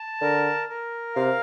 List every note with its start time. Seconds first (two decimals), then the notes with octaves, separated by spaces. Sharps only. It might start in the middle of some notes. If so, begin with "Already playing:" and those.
Already playing: A5
0.21 D3 A#4
0.69 A#4
1.15 C3 F5